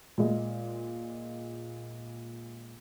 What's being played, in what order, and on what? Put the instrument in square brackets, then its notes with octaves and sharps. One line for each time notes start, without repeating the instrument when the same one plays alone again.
[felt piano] A#2 G#3